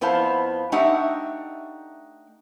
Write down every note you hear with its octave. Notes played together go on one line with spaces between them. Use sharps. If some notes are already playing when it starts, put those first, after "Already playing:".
F2 B3 E4 C5 F5 A5
A3 D4 D#4 G4 E5 F#5